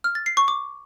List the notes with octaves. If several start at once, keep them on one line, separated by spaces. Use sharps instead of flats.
F6
A6
C7
C#6
D6